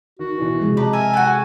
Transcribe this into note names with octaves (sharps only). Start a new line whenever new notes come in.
D#3 F#4
B2 E3
C3 F3 G#3
G4 B4 D#5 A5 A#5
A#4 E5 G#5
F#4 A4 G5 F#6